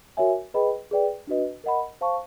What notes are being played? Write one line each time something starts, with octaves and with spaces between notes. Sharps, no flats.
F#4 A#4 C#5 E5 G#5
G#4 B4 D#5 G5 B5
G#4 B4 D5 G5
D4 F#4 B4 D#5
A#4 D#5 F#5 B5
C5 F5 A5 C#6